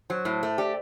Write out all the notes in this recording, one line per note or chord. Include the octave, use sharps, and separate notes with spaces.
F#3 C5
A2
A3
G4 D5